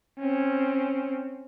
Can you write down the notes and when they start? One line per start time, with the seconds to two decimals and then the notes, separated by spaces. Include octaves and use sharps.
0.19 C4 C#4